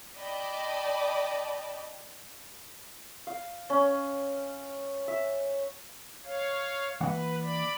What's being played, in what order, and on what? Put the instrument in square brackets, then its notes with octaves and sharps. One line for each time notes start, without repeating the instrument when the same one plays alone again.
[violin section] D5 D#5 G5 A5 B5 D6
[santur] F5
C#4
E5
[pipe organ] C#5 F5
[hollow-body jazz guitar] E3 A#3 F#5 [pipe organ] B4
[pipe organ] D5 B5